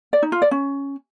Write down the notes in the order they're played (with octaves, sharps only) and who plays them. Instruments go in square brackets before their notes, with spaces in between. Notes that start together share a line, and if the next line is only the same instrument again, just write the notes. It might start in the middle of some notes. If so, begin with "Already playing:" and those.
[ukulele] D5
D#4
F4
D5
C#4